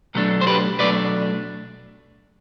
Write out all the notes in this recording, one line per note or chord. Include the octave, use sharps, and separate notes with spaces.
B2 F#3 A3 D4
C5
G4 B4
B2 F#3 A3 D4 B4 D5